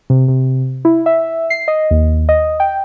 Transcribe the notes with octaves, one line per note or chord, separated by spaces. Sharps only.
C3
C3
E4
E5
C7
D#5
D#2
D#5
G5